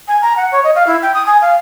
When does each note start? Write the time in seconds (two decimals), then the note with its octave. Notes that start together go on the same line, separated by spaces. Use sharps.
0.08 G#5
0.22 A#5
0.37 F#5
0.52 C#5
0.64 D#5
0.75 F5
0.87 E4
1.02 G5
1.14 D#6
1.26 G#5
1.41 F5